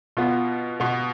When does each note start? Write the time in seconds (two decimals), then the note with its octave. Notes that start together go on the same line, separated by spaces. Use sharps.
0.17 B2 B3 F4
0.80 B2 B3